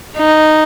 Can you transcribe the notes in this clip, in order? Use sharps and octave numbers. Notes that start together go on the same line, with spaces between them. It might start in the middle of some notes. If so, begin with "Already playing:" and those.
D#4